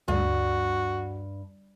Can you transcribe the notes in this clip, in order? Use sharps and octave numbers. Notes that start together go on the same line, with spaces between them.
D2 G2 F#4